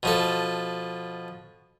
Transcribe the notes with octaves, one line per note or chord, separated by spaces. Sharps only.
B2 F3 A4